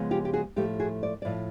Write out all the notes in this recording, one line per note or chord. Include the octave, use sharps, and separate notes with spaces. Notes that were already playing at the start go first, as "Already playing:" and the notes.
Already playing: C#3 F3 G#3 B3
F4 G4
G4
F#4 G#4
A2 F3 A3 G4 A4
F#4 G#4
D5
A2 F3 A3 D5